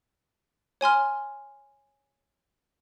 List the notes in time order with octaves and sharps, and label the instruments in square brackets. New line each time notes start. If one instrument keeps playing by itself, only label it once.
[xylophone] C#5 G#5 C6 F6